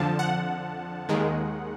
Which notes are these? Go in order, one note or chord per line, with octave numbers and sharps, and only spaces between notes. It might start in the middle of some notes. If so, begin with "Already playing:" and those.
Already playing: F2 D3 F3 A5
F#5
D#2 D#3 G#3